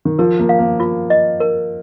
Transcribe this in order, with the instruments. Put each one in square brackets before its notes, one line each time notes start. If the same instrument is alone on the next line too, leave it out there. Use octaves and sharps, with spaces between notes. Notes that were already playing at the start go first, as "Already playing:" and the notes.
[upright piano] D#3
[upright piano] F3 [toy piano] A#4
[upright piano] A#3
[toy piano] F5
[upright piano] A#3
[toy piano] F4
D#5
A#4